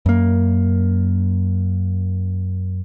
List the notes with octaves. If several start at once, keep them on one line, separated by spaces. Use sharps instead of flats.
F#2 A#3